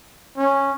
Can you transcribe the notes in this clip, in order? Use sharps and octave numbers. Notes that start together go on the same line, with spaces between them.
C#4